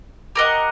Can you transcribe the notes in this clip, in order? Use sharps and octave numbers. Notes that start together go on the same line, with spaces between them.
G4 A#4 D#5 F#5